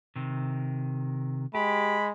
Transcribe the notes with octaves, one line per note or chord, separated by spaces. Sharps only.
C3 D#3
G#3 G4 B5